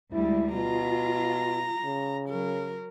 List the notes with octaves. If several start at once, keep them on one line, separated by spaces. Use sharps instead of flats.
D2 G3 G#3 E4
B2 F4 A#5
C#3
F#3 A#4